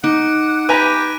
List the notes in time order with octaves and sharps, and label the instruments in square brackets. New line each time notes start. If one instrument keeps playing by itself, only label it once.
[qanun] D#4 [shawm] F#5 [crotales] D6 D7
[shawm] G4 [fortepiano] B4 G#5 A#5 [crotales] F#6 D#7